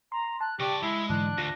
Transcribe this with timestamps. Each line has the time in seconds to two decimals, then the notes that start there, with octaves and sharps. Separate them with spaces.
0.12 A#5 C6
0.41 A5 F#6
0.60 C#3 G4 D5 C#6
0.83 G#3 E4 E6
1.09 G#2 D3 E3 D4 F#6
1.38 D2 F4 A#6